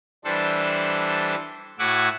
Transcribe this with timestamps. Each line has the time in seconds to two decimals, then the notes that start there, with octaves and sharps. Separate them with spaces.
0.24 E3 G3 D4 A4 C5
1.79 A2 F#4 E5 F#5 G#5 D6